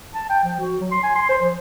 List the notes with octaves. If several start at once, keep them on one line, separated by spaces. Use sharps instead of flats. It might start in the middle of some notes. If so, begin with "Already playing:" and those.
A5
G5
F3
F#4
F#3
C6
G#5
C6
C5
F3